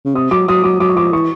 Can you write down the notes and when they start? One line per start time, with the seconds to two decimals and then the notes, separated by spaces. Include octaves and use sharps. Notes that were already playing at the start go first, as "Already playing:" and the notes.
0.05 C#3
0.15 C3 D#6
0.31 F#3 D6
0.48 F#3 D#6
0.64 F#3 D6
0.80 F#3 D6
0.89 C#6
0.96 F3 D6
1.12 E3 C#6